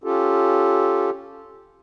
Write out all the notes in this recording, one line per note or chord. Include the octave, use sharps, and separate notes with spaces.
C#4 F4 G4 A4